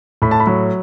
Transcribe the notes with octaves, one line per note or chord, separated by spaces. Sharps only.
A2 B5
A5
B5
F#3